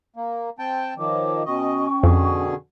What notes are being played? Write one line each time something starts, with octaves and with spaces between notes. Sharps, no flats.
A#3
C4 G5 A5
D#3 F3 C#5 D#5 D6
B2 C#4 D#5 G5 C#6
F2 B2 D3 G#4